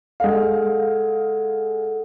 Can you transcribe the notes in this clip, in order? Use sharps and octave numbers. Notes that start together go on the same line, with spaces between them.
G#3 A4 F5 F#5